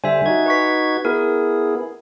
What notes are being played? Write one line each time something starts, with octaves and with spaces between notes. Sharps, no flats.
D3 G3 C5 E5 G#5
D#4 F#4 G#6
B4 C#6 B6
B3 E4 G#4 A#4